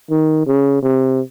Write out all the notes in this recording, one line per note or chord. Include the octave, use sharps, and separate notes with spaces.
D#3
C#3
C3